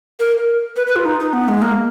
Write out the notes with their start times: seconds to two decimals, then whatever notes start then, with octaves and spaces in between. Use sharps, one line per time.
0.20 A#4
0.76 B4
0.87 B4
0.96 F4
1.05 D#4
1.20 D#4
1.33 B3
1.48 G#3
1.62 A#3